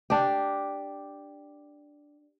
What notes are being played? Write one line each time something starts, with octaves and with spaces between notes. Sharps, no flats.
D4 G4